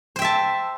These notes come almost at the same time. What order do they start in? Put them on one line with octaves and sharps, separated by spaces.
C5 G5 E5 A5